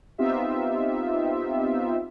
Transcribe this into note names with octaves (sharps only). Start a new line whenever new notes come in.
B3 C4 D#4 F4 G4 E5